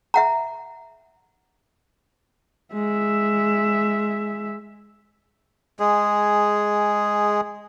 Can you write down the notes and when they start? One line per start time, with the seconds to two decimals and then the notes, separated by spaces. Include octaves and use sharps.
0.14 E5 F#5 A#5
2.73 G#3 E5
5.80 G#3 G#4